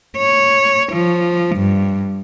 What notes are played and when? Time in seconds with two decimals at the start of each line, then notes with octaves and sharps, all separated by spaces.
0.17 C#5
0.93 F3
1.56 G2